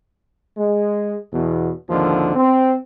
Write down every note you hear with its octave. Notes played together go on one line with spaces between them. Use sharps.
G#3
E2 B2
G#1 D#2 D3 F3
C4